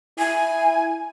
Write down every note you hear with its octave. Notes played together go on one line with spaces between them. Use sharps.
E4 G#5